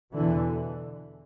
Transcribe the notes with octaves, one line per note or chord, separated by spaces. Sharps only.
E2 B2 D3 E3